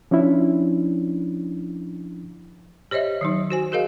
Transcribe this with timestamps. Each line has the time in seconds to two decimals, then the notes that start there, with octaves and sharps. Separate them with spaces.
0.11 F3 C#4 D4 E4
2.91 G4 C5 C#5 D#5 E5
3.21 D#3 F#3 D#4
3.50 F#4 C5 G#5
3.72 F#4 G#4 A#4 D#5 F5